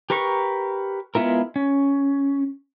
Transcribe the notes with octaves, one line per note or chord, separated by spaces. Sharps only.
G4 A#4 B4 A#5 C#6
G#3 B3 E4 F4 A#4
C#4